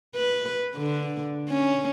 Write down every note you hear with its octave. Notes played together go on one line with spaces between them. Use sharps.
B4
D3
C#4